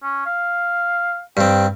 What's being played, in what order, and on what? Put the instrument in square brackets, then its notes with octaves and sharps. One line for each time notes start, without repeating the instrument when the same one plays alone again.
[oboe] C#4
F5
[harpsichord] G2 C4 [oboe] G5